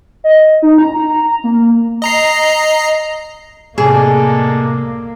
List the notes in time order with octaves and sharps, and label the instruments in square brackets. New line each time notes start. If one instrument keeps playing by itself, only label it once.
[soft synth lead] D#5
D#4
A#5
A#3
[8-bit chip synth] D#5 A#5 C7
[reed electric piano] A2 C3 [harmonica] G#3 A4 D5 [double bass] A#3 [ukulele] G#4